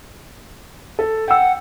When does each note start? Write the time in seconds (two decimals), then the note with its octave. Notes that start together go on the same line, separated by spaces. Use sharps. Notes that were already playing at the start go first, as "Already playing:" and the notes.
0.99 A4
1.28 F#5 G5 E6